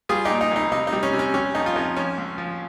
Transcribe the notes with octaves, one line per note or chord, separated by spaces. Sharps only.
G3 F4 G#4
D#4 G4
A#2
D#4
C2 D#4
C3 D#4
D#4
G3
C#4
C3
C#4
G3 C#4
F2 D#4
F4
F2 D#4
F3 C#4
C#2
F3